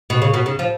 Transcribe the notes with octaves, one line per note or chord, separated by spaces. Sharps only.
B2
C#3
B2
C#3
F3